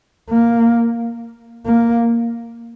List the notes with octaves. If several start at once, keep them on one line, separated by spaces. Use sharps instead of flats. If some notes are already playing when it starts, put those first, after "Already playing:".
A#3
A#3